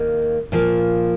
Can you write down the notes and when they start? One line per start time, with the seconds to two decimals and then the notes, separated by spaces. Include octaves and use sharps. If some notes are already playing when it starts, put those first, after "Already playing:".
Already playing: D#2 D#3 A#3
0.52 A#2 F3 A#3